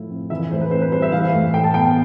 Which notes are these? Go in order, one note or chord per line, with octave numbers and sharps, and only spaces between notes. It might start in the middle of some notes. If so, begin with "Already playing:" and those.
Already playing: A2 F3 E4 F4
C4
E3 E5
A2 C5
B4
C4 C5
B4
G3 C5
E5
E3 F5
A2
A2 G5
A5
B3 G5